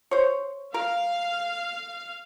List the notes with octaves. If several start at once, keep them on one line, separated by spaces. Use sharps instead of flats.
C5 C#5
A#4 F5